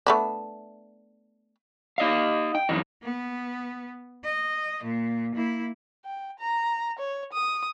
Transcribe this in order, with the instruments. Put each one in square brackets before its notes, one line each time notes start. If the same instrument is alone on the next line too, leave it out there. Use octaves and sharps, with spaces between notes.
[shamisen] A3 B3 D4
[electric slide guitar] D#4 D#5 F5
G5
F#2 E3 D#4
[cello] B3
D#5
A#2
A#3 E4
[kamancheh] G5
A#5
C#5
D#6